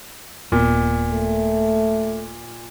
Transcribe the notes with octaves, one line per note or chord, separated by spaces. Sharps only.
D#1 A#2 B3
A3